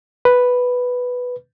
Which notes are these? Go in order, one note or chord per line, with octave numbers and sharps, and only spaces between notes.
B4